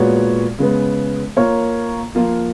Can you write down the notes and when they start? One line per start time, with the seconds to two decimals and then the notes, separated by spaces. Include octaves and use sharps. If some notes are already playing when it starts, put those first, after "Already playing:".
Already playing: A#2 G#3 B3 F#4 C#5
0.59 C#3 G#3 B3
1.37 A#3 F4 A#4 C#5
2.15 F3 A#3 F4